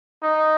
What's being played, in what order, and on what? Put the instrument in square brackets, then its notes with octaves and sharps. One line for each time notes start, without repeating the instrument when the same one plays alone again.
[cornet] D#4